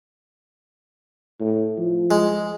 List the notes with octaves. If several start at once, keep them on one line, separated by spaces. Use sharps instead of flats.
A2
F3
G#3